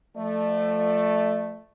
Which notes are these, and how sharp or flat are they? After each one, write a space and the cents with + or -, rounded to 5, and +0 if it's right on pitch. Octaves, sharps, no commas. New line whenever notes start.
F3 +0 A3 +0 D5 +35